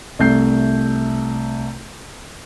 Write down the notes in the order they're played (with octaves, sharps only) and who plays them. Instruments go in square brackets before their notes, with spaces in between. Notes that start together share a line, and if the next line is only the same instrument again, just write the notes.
[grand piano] C2 A3 G6 C7